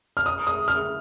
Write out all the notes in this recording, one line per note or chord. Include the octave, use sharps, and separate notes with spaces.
F6
D#6
D#6
F6